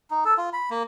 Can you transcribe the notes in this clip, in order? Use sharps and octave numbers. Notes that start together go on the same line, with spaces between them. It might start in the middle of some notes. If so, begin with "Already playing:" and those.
D#4
A4
F4
B5
A#3